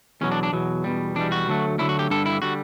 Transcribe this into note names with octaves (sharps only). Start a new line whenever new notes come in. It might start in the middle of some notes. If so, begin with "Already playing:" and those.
E2 B2 F#3 C#4
D4
D4
E2 B2 F#3
E2 B2 G3
E2 B2 G3 D4
F#4
D2 D3 F#3 A3
D2 D3 F#3 A3 E4
F#4
G4
G2 D3 G3 A4
E4
D3 G3 F#4